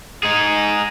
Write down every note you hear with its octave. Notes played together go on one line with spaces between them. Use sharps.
D#4 G#4